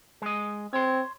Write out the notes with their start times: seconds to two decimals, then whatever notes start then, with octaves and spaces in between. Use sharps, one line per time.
0.22 G#3 D#5
0.73 C4 C#5 C6